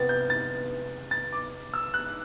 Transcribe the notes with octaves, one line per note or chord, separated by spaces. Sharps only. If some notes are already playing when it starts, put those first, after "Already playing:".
Already playing: C3 E3 B3 A6
G6
A6
A6
D6
E6
F#6